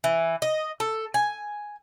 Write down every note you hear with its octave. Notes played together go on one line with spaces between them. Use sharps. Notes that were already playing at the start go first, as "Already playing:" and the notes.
E3
D#5
A4
G#5